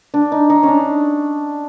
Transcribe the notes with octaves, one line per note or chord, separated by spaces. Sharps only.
D4
D#4
D#4
C#4
D4